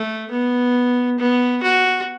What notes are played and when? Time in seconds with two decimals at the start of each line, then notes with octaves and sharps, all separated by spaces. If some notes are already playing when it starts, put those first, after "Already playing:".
Already playing: A3
0.31 B3
1.19 B3
1.63 F#4